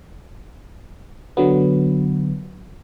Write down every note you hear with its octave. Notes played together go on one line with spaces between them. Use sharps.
D3 F#3 B3